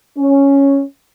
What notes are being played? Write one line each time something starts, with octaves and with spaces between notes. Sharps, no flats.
C#4